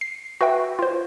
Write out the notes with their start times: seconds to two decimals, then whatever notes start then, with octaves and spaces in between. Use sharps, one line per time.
0.01 C7
0.41 F#4 B4 E5 G5
0.79 F4 C5